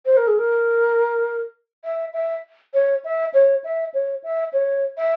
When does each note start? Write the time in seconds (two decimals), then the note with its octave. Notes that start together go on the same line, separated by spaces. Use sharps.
0.06 C5
0.17 A#4
0.27 G#4
0.38 A#4
1.84 E5
2.14 E5
2.74 C#5
3.04 E5
3.34 C#5
3.64 E5
3.94 C#5
4.24 E5
4.53 C#5
4.97 E5